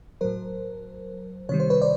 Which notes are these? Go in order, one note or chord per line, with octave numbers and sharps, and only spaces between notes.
A2 F#3 A#4 C5
C3 D#3 G3 C#5
C5
B4 C#5
C5 D5